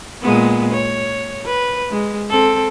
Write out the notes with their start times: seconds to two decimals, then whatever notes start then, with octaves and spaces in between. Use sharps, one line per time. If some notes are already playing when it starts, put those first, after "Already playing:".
0.22 A#2 G#3 B3
0.73 C#5
1.46 B4
1.91 G#3
2.30 C4 A4